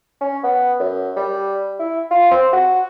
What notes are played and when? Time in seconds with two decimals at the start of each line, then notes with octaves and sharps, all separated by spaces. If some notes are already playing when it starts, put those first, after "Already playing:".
0.21 C#4
0.43 B3
0.80 F#2
1.17 G3
1.79 E4
2.11 F4
2.31 C4
2.53 F#4